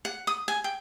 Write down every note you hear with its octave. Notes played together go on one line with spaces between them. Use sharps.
F#5
D#6
G#5
G5